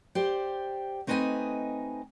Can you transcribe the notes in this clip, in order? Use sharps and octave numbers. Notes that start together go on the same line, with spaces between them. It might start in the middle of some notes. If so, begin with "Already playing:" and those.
G4 C5 D5
A3 C4 D#4 B4 D#5 G#5